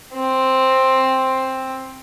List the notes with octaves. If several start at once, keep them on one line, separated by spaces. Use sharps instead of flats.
C4